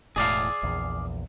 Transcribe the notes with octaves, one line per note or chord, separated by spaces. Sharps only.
E1 A2 G#4 D5 F5
A#1 E2